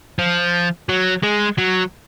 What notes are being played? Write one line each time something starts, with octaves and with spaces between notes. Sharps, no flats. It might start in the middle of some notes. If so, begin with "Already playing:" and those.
F3
F#3
G#3
F#3